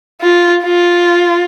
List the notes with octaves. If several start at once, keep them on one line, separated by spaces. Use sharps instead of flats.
F4
F4